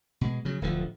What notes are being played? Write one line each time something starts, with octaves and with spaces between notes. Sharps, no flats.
B2 G#3
C#3 F#3
D1 D2 D3 F3